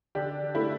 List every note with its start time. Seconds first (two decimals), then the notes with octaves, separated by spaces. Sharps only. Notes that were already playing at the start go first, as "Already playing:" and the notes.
0.15 D3 D4 G4
0.55 A3 E4